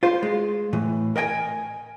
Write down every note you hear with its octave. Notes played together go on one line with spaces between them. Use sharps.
F4 C5
G#3
A2 E3
A#4 D#5 G5 G#5